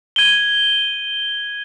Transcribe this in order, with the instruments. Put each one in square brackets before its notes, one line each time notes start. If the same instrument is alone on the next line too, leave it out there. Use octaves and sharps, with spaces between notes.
[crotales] G#6 D#7 G7